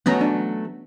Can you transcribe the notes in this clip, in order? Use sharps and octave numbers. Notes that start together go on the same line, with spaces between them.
F#3 A3 B3 C#4 F#4 A#5
D4